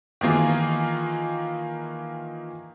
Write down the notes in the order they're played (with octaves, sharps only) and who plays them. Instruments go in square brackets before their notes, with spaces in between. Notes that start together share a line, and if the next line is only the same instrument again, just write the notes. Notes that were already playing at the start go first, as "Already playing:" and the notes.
[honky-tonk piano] D#3 E3 A#3 F4 G#4